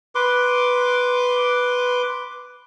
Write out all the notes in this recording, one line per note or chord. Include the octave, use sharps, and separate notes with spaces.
B4 C6 D6